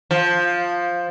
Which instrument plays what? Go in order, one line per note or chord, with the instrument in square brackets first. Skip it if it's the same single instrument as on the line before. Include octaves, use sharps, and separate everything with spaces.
[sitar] F3